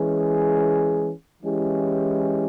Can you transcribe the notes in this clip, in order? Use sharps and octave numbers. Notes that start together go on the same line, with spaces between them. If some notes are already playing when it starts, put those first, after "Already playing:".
Already playing: E3 G#3 C#4 G#4
E3 G#3 C#4 E4 G4